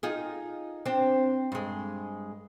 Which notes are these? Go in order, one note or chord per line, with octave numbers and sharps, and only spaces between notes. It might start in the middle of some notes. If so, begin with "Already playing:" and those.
D#4 F4 G#4
C4 D4
G2 G#3